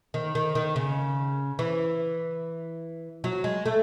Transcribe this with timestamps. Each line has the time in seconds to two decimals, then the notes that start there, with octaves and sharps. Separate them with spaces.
0.14 D#3
0.35 D#3
0.55 D#3
0.76 C#3
1.59 E3
3.24 F#3
3.44 G#3
3.66 A3